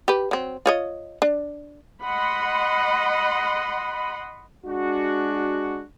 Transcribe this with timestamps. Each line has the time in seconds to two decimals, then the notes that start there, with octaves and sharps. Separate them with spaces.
0.08 G4 B4
0.31 F#3 C4
0.66 F4 C#5 D#5
1.22 D4
2.02 D#5 F#5 B5 C6
4.66 G#3 D4 F#4